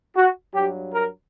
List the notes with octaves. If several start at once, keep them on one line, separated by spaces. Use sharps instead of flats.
F#4
G2 F#3 G4
A#4